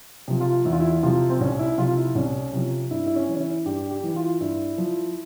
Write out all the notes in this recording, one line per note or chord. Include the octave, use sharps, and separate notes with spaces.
C3 F3
F4
E2 E4
F4
E4
E4
C3 F3 F4
C4
C2 C#4
E4
C3 F3 F4
E4
C2 C#4
C3 F3
G2 E4
E4
C#4
E3
C#4
E4
G2 G4
G4
E3
F4
G2 E4
F3